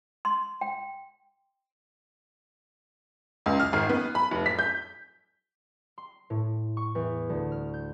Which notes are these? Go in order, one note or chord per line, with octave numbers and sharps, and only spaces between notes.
C6
G5
C#2
F6
G#1
B3
B5
F1
B6
G6
C6
A2
C#6
E2
D2
F6
G6